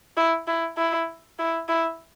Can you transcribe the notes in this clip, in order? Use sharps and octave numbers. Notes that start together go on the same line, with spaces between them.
E4
E4
E4
E4
E4